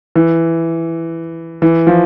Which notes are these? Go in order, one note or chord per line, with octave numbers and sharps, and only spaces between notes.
E3
E3
F3